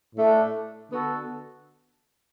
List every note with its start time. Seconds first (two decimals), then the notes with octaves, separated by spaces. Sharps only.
0.14 A2 A3 D4 A4
0.91 D3 B3 F#4 A4